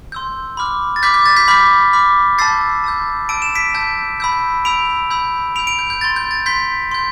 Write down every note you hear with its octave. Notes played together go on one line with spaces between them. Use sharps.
C6 E6 G6
B5 D6 F6
A6
B5 D6 F6 G6 B6
G6
A6
G6 B6
B5 D6 F6 G6 B6
B5 D6 F6
A5 E6 G6 A6 C7
A5 E6 G6
A5 E6 G6 D7
E7
B6 D7
A5 E6 G6
B5 E6 G6
B5 E6 G6 D7 F7
B5 E6 G6
B5 E6 G6 D7 F7
D7 F7
G6
G6
C6 G6 A6
G6
A6
C6 G6 B6
C6 G6